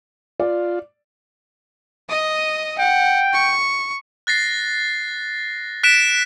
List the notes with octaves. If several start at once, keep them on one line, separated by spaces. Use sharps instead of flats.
F4 D5
D#5 D#6
F#5 G5
C#6
F#6 A6 A#6 C7
F#6 B6 D7 E7